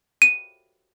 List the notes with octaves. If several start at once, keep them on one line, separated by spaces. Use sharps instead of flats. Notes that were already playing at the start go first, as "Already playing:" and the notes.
D#7